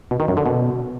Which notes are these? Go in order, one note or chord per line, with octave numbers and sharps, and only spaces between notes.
B2
D#3
F#2
D3
B2